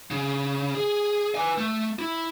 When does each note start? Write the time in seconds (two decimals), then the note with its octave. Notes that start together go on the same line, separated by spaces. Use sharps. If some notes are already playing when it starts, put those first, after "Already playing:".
0.11 C#3
0.75 G#4
1.35 B4 G#5
1.58 A3
1.99 E4